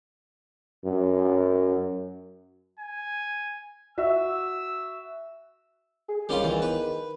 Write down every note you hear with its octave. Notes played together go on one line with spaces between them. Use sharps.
F#2
G#5
F#4 E5 E6
G#4
D#3 G3 C#4 F4
E2 E3
B4